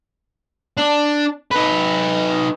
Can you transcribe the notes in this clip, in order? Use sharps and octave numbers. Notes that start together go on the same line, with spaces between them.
D4
D#4 B4